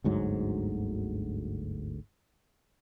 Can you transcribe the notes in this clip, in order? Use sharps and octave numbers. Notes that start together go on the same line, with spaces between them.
G1 D2 G#2 F#3